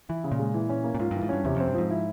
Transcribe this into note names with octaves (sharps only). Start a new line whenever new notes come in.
E3 E4
C#3
A#2
G#3
E3
C#4
A#3
A#2
G#2 F4
G2 E3
G#2
G2 C#4
E2 C3
F2 C4
G2
G#2 F3
E4